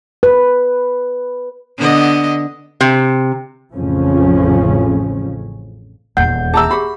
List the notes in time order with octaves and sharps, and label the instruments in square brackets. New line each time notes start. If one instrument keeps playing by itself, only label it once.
[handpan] B4
[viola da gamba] D3 B3 D#5
[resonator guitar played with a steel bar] C3
[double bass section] A1 F2 C#3 F3 C#4
[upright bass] D#1 E2 [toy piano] F#5 [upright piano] G6
[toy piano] G#4 E5 [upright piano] A5 A#5 E6
[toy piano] G4 G#4 [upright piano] B5